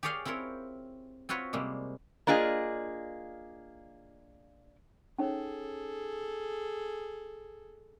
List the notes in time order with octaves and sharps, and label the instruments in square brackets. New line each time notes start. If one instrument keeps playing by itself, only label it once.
[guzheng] G4 G#4 C#5 D5 F5 G5
C4 E4 F4 A#4 C#5
C4 F4 F#4 B4 C#5
C3 G3 G#3 A#3
[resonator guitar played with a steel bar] A#3 D4 F4 G#4 D#5
[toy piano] C#4 D#4 C#5 [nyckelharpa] G#4 A4